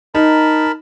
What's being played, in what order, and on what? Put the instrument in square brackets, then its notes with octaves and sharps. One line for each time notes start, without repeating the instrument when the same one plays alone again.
[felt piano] D#4 [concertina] A#4 A5 B5